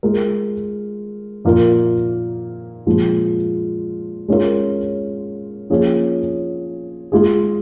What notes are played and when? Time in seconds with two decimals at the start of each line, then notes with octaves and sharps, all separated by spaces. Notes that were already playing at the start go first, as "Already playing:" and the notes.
0.03 G#3 F4 A#4
1.45 A#2 F3 A#3 F4 A#4
2.87 A#2 F3 G#3
4.28 G#3 C#4 F4 A#4
5.70 F3 A#3 C#4 G#4
7.12 G#3 F4 G#4